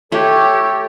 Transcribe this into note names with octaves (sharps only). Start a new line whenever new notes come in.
A3 G4 A4 C#5